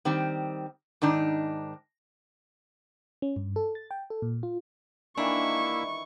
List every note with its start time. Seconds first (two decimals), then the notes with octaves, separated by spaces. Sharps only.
0.05 D#3 G3 C4
1.02 G#2 D#3 D4 D#4
3.22 C#4
3.36 G2
3.56 A4
3.75 A6
3.91 G5
4.10 A4
4.22 A#2
4.43 F4
5.17 D#3 E3 A#3 D4 E4 E5 C#6